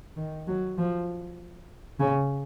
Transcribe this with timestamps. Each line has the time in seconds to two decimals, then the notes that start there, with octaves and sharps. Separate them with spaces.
0.16 D#3
0.47 F#3
0.78 F3
2.00 C#3